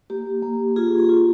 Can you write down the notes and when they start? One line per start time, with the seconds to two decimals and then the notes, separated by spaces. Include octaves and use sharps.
0.10 A#3 G4
0.42 A#3
0.76 F4 G#4
0.98 G#4
1.09 F4